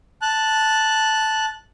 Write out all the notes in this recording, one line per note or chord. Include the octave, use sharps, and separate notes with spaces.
A5 F#6